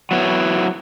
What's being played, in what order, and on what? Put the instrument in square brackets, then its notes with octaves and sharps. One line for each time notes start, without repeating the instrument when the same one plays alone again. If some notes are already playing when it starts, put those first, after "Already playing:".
[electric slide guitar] F#3 B3 E4